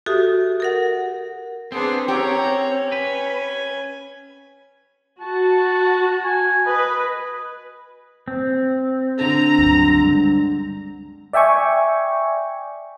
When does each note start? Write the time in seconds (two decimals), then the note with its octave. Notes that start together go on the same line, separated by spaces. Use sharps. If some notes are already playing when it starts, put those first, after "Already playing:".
0.06 F#4 G4 A4 E5 D#6
0.60 A4 A#4 F#5
1.72 B3 C4 D4 G#4 C6
2.08 C#4 G4 C#5 A#5
2.92 B4 G#5
5.21 F#4 A5
6.24 G#5
6.66 B4 D#5
8.28 C4
9.21 D3 A#5
9.58 C#2 G2 F#3
10.02 G3 G#3
11.33 D5 E5 G5 G#5 C#6